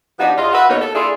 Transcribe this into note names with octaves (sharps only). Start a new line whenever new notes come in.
F3 B3 D4 D#4 F#4 G4
E2 F4 D#5
F#4 B4 E5
E2 B2 A#3 B3 D#4 C#5
A4
A#3 D4 E4 F4 G#4 A4